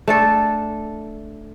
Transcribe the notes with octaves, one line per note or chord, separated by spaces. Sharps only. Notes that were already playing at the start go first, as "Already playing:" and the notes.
A3 D4 A4